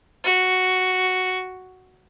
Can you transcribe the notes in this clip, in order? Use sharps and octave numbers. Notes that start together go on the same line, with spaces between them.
F#4